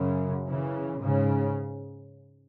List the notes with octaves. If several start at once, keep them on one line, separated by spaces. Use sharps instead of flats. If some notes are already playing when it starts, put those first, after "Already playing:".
Already playing: F#2 C#3
C#3 E3
G#2 C#3